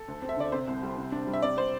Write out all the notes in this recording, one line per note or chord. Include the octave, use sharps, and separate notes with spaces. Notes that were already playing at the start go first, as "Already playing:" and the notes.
Already playing: A4
D2
C4
E5
D3 D5
C3 C5
C2
G3
C3
D4
G3
E5
C3 D5
C4 C5